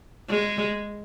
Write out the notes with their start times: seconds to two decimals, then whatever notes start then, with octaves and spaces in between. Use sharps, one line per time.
0.29 G#3